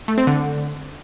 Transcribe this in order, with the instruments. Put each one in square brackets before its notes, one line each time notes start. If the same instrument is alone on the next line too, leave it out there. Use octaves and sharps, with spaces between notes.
[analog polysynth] A3
C4
D3